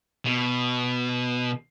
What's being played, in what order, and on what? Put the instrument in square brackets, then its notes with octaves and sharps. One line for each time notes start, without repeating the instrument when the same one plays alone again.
[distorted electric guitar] B2